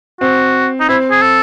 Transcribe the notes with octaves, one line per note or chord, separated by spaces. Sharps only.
C4 F#4
D#4
C4 E4
G#4
A4